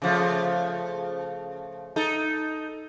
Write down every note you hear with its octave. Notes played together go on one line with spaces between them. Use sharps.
C#3 F3 A3
D#4 A4